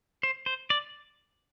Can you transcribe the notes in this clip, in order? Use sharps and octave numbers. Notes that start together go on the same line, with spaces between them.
C5
C5
D5